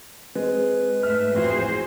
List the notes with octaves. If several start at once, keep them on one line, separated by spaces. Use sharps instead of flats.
G#3 C4 B4
G#2 A3 E5 F6
A1 F2 F#4 G#4 C5